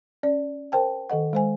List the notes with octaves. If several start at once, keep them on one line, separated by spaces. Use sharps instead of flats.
C#4 D5
A#4 C5 G5 A5
D#3 A4 D#5 F#5
G#3 C5 G#5